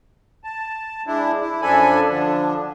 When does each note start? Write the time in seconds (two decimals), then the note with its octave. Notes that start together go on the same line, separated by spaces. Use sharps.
0.44 A5
1.07 G#3 D4 E4
1.40 E4
1.62 F#2 F3 D4 A4 G#5 B5
2.08 D3 F3 D4